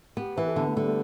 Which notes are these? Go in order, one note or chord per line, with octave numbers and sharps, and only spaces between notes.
B3 G4
E3 B4
A4
D3 B3
A3
D3 G3
A3